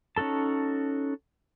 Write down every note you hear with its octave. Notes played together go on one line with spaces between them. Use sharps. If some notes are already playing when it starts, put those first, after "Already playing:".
C#4 D#4 F#4 A4 A5